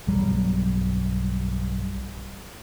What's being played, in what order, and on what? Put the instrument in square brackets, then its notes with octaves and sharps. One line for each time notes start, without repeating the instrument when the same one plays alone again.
[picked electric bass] B1 G2 F#3 G3